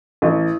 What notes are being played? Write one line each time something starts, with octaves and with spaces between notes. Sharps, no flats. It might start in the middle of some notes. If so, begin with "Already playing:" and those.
A1